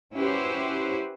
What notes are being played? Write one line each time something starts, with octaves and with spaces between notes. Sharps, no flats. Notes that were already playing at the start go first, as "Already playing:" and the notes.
C#4 E4 F#4 G4 B4 C5